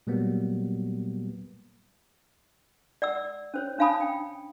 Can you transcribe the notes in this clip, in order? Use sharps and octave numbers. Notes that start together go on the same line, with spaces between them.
A#2 F#3 G3 A#3 B3
D5 F#5 E6
C#4 C5 C#5
C#4 D4 F5 A5 B5 D#6
G5